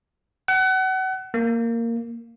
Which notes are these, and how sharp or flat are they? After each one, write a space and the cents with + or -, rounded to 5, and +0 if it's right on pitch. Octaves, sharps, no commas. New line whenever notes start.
F#5 +30
A#3 -10